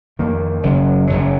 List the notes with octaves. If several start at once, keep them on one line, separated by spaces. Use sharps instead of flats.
F2 D#3 A#3
F#1 F#2 C#3 F#3
F#1 F#2 C#3 F#3